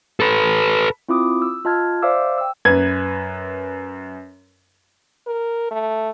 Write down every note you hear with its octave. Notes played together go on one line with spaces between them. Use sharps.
A4 B4
C4 E4 F4 D6 D#6
E6
F4 D#5 A5 F6 G#6
C5 D5 E5 F5 D6 E6
G5 E6
F#2 B4 G#6
A#4
A3